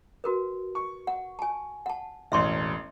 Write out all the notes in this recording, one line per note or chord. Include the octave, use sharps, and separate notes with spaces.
F#4 A#4 B4
C#6
F#5
G#5 A5
F#5 A5
E1 A1 E5 C6 C#6